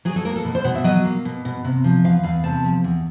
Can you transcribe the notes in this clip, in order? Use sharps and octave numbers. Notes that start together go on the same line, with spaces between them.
F#3 G#4
A4
A#3 A#4
A4
B2
C5
B2 F#5
E5
F#3 D#5
A#3
B2
B2
C3
F3
E2 F5
E2 F5
C3 A5
F3
E2